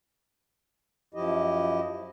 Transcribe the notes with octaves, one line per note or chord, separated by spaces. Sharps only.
F#2 F3 E4 G4 D#5